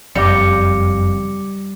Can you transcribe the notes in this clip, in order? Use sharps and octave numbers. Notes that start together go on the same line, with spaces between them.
F#1 F2 G3 D6 A#6 C#7